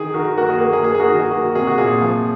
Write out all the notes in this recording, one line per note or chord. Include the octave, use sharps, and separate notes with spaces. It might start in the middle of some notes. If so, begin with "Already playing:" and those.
Already playing: D#3 G#4
D#3 F#4 A#4
A#3 F#4 A#4
G#4
A#3
G#4
A#3 G#4
G#4
F#4 A#4
D#3
G#4
A#3 F#4
C3 G#4
F#4
A#2 G#4
F3